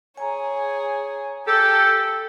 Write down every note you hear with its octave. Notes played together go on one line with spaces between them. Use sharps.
G#4 C#5 G#5 A#5
G4 A4 G5